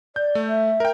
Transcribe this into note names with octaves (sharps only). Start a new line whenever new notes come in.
D5 G6
A3
E5
A#4 G5